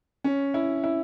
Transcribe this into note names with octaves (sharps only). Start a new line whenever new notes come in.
C#4
E4
E4